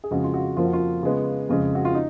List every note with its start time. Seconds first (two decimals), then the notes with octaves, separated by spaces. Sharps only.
0.04 G#4
0.11 F2 C#3 G#3 F#4
0.24 F4
0.34 F#4
0.57 F2 F3 A#3 F4
0.65 F#4
0.73 F4
1.03 C#3 G#3 B3
1.49 F2 C#3 G#3
1.75 F#4
1.85 F4
1.94 D#4